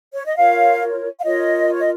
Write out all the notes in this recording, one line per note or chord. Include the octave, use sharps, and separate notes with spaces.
C#5
D#5
F4 A#4 C#5 F5
F5
F4 A#4 C#5 D#5
C#5
D#5